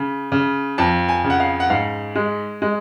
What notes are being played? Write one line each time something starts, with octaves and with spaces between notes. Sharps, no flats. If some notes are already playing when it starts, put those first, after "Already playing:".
Already playing: C#3
C#3
F2 A5
G#5
C#3
F#5
F5
F#5
G#2 F5
G#3
G#3